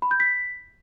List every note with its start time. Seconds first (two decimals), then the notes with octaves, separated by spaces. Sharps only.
0.02 B5
0.11 G6
0.20 B6